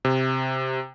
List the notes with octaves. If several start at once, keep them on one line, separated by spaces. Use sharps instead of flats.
C3